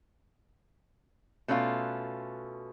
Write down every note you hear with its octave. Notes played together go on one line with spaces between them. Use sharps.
B2 A3 C#4 D#4 F4